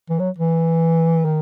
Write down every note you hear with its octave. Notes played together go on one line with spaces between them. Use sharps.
E3
F#3
E3
D#3